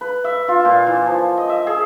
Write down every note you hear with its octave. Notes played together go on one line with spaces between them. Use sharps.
B4
E5
F4
A#2
E3
F3
D#5
E5
G#4